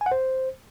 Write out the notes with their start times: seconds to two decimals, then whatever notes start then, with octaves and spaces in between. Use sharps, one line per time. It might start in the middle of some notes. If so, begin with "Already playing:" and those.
0.01 G#5
0.06 F#5
0.12 C5